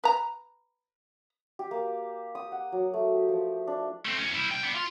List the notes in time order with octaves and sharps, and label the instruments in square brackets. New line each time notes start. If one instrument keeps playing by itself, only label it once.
[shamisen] B4 A#5
[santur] G4
A#3
D#6
F#5
F#3
A3
G4
F3
D4
[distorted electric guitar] A3 C4
E2 C#4
G3 E4
C2 G5
B3 D4
F4